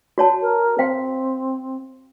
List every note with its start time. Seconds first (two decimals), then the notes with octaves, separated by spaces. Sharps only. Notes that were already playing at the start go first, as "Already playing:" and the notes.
0.18 F#4 C#5 A5
0.42 A#4
0.78 C4 C5 F5 G5